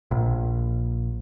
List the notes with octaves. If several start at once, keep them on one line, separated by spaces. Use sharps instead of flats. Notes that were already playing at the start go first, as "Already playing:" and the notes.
A#1